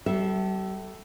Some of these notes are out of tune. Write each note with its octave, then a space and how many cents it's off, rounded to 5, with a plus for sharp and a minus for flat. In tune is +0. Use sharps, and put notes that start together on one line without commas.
G3 -40 A4 +0 E5 +0